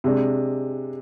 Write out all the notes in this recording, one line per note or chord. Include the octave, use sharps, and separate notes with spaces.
C3 G#3 D4